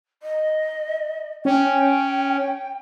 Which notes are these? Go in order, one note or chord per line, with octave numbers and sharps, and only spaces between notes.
D#5
C#4 G5